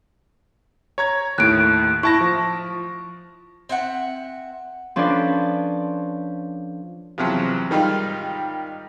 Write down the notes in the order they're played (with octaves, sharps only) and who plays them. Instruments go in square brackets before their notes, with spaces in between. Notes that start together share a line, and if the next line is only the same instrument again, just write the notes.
[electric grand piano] C#5 A#5 G#6
[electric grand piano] D#2 A2 [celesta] F#6 D7
[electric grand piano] E4 A5 A#6 [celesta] C#6
[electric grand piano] F3
[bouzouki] C4 E5 F#5
[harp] F3 C#4 D4 A4 B4 D5
[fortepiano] E2 C3 F3 F#3
G#2 D#3 G3 D#4 F4